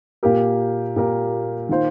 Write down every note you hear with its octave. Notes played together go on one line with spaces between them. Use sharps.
A#2 A#3 G4 A#4
A#2 A#3 G4 A#4
D#3 A#3 F4 C5